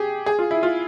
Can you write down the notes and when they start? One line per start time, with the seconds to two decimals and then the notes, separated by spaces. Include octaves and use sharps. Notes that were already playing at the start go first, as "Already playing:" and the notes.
Already playing: G4 G#4
0.26 G#4
0.39 F4
0.51 E4
0.63 F4